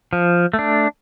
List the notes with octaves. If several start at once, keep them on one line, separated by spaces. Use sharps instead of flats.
F3
A3
D4